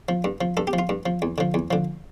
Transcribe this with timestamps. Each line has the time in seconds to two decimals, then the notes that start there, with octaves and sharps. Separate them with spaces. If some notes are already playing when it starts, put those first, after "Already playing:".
0.09 F3
0.24 G2
0.41 F3
0.57 G2 A4
0.67 G4
0.73 F3
0.79 F4
0.89 G2
1.06 F3
1.22 E2
1.38 D3 F3
1.54 E2
1.71 D3 F3